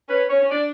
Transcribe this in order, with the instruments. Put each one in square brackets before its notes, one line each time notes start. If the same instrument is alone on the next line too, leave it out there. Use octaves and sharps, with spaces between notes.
[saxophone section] C#4 [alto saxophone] B4
[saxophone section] C#4 [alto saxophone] C#5
[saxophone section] C#4
[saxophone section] D4 [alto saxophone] D5